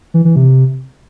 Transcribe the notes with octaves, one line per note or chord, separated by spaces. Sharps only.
E3
E3
C3